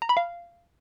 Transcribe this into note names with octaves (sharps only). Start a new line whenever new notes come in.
A#5
B5
F5